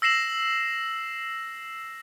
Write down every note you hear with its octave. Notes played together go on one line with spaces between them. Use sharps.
E6 A#6 C7 E7 F#7